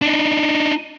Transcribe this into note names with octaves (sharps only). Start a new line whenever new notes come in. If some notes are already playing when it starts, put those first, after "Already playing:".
D4 D#4